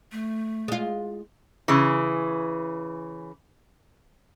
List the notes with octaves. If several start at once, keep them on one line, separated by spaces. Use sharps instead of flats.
A3
G#3 F4
C#3 E3